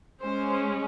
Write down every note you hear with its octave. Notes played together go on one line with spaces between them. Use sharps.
G#3 C#4 C5